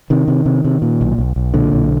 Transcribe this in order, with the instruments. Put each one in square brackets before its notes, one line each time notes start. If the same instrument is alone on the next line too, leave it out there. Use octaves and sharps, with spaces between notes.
[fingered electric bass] C3 D#3
C3
C3
C3
A#2
B1
B1
B1
A#2 D3
B1